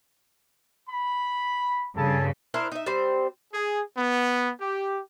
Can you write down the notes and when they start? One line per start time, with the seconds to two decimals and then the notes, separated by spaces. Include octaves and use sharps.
0.89 B5
1.96 G2 C#3 A4 G#5 A5
2.54 D4 E4 A#4 C5
2.72 D#4 E5
2.86 G3 C4 C5
3.53 G#4
3.97 B3
4.61 G4